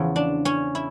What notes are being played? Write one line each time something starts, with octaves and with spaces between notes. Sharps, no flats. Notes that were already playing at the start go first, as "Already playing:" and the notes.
Already playing: E2 C#3 F3
D4
C#4
E4